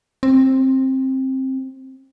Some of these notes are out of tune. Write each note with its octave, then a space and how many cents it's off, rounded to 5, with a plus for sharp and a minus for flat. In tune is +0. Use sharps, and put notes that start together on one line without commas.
C4 +15